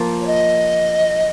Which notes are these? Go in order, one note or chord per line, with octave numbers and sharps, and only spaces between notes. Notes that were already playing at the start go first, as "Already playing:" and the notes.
Already playing: F3 A#3 F4
C#5
D#5